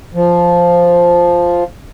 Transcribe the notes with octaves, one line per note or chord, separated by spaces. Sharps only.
F3